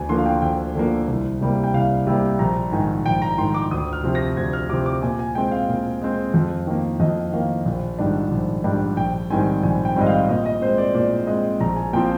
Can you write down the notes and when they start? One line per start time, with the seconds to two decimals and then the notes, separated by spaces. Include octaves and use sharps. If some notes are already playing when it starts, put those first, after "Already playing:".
Already playing: D2 G#5
0.09 D3 F3 A#3 C6
0.18 F5
0.26 G5
0.42 D2 G5
0.75 D3 F3 A#3
1.08 C2
1.41 C3 G3 A#3
1.64 G5
1.74 C2 F5
2.07 C3 G3 A#3
2.39 A#1 A#5
2.72 G#2 D#3 G#5
3.05 A#1 G5
3.22 A#5
3.38 G#2 D#3 C6
3.55 D6
3.71 D2 D#6
3.93 F6
4.04 C3 F3 C4
4.15 A#6
4.37 D2 G#6
4.53 F6
4.70 C3 F3 C4 D6
4.86 D6
5.02 A#2 G#5
5.19 G#5
5.35 G#3 C4 G5
5.52 F5
5.68 A#2
6.02 G#3 C4
6.34 F2
6.67 D#3 A#3
7.00 F2 D#5
7.33 D#3 A#3 F5
7.65 A#1
7.99 G#2 D#3 G3 D4
8.32 A#1
8.64 G#2 D#3 G3 D4
8.97 A#1 G5
9.30 G#2 D#3 G3 C4 G#5
9.63 A#1 G#5
9.85 G5
9.96 G#2 D#3 G3 C4 D#5
10.07 F5
10.29 A#2 D#5
10.46 D#5
10.62 G#3 C4 C5
10.78 D5
10.95 A#2 D5
11.27 G#3 C4 D#5
11.60 A#1 A#5
11.76 G#5
11.93 A#2 F3 C4 F4 G5